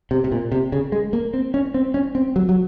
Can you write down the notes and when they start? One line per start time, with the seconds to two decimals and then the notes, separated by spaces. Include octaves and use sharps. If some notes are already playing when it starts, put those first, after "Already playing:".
0.11 C3
0.24 C3
0.32 A#2
0.52 C3
0.72 C#3
0.92 G#3
1.13 A#3
1.34 C4
1.54 C#4
1.74 C4
1.94 C#4
2.15 C4
2.36 F#3
2.49 F#3